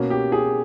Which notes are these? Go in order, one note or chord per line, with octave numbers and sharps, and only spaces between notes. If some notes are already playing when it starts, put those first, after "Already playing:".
Already playing: B2 A#3 C#4
G4
G#4